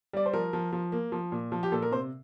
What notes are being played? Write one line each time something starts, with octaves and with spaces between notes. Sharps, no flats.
G3 D5
C5
F3 A#4
F3
F3
A#3
F3
A#2
F3
G4
A#2 A4
A#4
C3 C5